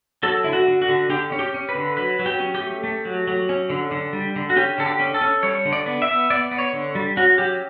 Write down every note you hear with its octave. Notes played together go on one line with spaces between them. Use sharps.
F#3 A4
D3 E4
F#4
D3
F#4
D3
D3 G4
C#4
G4
C#4
B4
D3
F#3 B4
F#3
G4
C#4
G4
A3
A3
F#3
F#3
C#4
D3
D3
G3
D3
F#4
C#4 G4
D3 A4
G4
C#4
A4
C#4
G3 C#5
D3
D5
B3
E5
B3
B3 D5
B3
C#5
D3
G3
C#4 F#4
F#3 G4